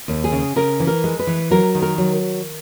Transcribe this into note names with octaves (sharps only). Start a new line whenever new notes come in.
D#2
G#4
C#3
C#3 A#4
E3
A#4
G#3
B4
E3
F#3 A#4
D#3
A#4
F#3